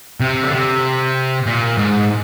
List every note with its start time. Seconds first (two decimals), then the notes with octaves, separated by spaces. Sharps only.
0.20 C3
0.43 D3
0.53 C3
1.46 A#2
1.78 G#2